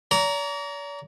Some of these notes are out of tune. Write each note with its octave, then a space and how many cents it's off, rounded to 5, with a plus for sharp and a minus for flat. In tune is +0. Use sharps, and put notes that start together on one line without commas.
D5 -45 A#5 +0